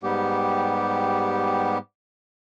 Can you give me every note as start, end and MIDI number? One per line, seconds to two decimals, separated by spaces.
0.03 1.78 44
0.03 1.78 55
0.03 1.78 59
0.03 1.78 67